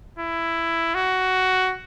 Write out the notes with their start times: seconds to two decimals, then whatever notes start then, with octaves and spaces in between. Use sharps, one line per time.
0.19 E4
0.95 F#4